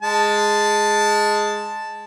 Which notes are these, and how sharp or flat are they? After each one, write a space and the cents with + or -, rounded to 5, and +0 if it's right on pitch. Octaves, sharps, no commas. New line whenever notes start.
G#3 +0 A5 +0